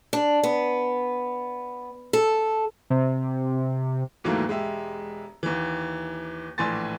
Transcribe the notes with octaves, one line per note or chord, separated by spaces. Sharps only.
D4
B3
A4
C3
D#2 G#2 E3 F#3 A3 A#3
E1 G#3 G4 E5
D#2 E3
A#1 A2 E3 G#5 C6 A6